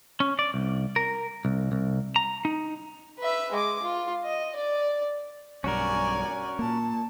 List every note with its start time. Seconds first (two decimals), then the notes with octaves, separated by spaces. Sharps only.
0.20 C#4
0.39 D5
0.54 C2
0.96 A#4
1.45 C2
1.72 C2
2.16 A#5
2.45 D#4
3.19 B4 E5
3.52 G#3 D6
3.83 F4
4.25 D#5
4.56 D5
5.64 B1 G2 C#4 F#4 A#4 D5 G#5
6.59 A#2 A#3 A5